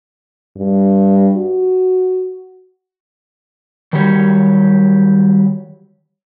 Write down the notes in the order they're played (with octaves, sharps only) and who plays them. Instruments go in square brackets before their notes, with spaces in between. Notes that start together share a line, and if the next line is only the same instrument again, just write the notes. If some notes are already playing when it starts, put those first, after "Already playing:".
[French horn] G2
F#4
[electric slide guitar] D#3 F#3 G3 G4 C#5